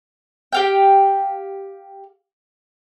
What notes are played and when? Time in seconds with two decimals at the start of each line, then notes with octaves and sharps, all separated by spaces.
0.52 G4 F5 G5